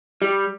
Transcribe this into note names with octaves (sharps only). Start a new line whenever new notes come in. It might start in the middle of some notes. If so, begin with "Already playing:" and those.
G3